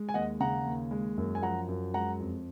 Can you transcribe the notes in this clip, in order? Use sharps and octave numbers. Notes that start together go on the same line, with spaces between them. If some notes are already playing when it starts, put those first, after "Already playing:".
Already playing: G#3
G#5
D#2 D#5 F#5
C#3 F#5 A#5
D#2
G#3
F#2
G#5
F3 F#5 A#5
F#2
G#3 F#5 A#5
F2